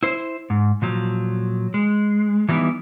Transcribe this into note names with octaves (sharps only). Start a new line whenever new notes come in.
E4 C5
G#2
A#2 F3 F#3
G#3
E3 F#3 G3 B3 D#4 E4